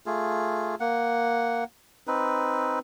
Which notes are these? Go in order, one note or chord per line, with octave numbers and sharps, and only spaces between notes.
A3 F4 G#4
A#3 F#5
C4 D#4 B4